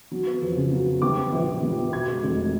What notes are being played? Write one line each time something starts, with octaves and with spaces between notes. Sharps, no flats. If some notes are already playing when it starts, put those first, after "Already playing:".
F#3
B3
F2
C#3
F#3
B3
G3 D6
B3
A#1
A#2
G3
B3
B2 G#6
G#3
F1